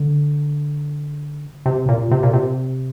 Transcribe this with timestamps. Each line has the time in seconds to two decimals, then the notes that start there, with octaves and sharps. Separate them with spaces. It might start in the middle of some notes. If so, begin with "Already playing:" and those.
Already playing: D3
1.66 C3
1.89 A#2
2.11 C3
2.23 A#2
2.33 C3